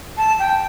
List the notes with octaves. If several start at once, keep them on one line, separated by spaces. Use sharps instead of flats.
A5
G5